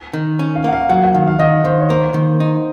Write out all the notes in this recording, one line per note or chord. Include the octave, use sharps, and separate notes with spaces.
D#3
C#4
F5
A#3 F#5
F5
F#3 F#5
F#5
D#3 F5
F5
D#3 D#5
D#3 C5
C#5
A#3 C5
D#3
D#4